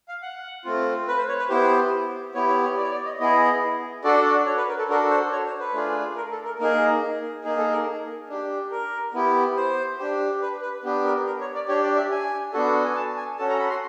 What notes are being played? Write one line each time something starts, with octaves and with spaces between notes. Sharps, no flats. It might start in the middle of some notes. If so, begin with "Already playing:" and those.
F5
F#5
A3 C4 F4
B4
C5
C#5
B4
B3 E4 G4 C5
B3 E4 G4 C#5
C#5
C#5
D5
C#5
D5
D#5
B3 E4 G#4 D#5
D4 F#4 A4 D5
D5
C#5
B4
A#4
A4
D4 F#4 A4 A#4
C5
C#5
C5
B4
A3 D4 F4 G#4
A#4
A4
A#4
A#3 D#4 G#4 A#4
A#3 D#4 G#4
A4
A#4
D4 G4
A#4
B3 E4 G4
C5
D4 G4
B4
B4
B3 D4 G4
A#4
A#4
C#5
D5
D4 G4 C#5
D5
E5
G#5
B3 D4 F#4 A4
G#5
A5
G#5
C#4 F#4 A4 A5
A#5
B5
C6